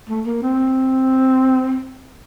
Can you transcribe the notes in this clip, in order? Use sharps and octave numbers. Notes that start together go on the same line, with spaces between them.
A3
A#3
C4